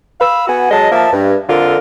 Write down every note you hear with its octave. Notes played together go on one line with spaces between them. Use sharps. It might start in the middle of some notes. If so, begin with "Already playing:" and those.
F5 B5 E6
B3 F#4 F#5 G#5
F#3 G#3 D#5 A5
F3 A#3 E5 A5
G2
F2 D3 F4 A#4